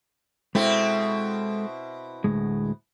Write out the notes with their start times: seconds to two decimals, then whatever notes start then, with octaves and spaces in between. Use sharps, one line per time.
0.55 B2 G#3 C4 E4 A4 G5
2.24 D2 A2 G#3